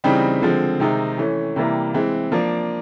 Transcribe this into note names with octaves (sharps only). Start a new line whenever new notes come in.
C#3 E3 G3 C4 D#4
D3 F3 G#3 C4
C3 D#3 G#3 C4 D#4
E3 A3 C#4
C3 E3 G3 A#3
E3 G#3 C4
F3 A#3 D4